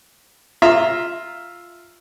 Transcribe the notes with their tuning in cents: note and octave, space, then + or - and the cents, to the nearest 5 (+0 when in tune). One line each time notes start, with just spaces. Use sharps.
F4 +0 E5 +0 A#5 +0